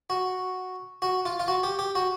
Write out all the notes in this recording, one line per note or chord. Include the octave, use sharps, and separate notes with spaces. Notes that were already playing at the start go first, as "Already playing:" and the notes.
F#4
F#4
F4
F4
F#4
G4
G4
F#4